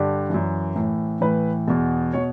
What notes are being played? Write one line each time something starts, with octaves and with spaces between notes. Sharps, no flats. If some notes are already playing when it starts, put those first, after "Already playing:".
Already playing: G2 D3 G4
F#2 E3
A2 E3
A2 E3 B4
E2 B2
B2 C#5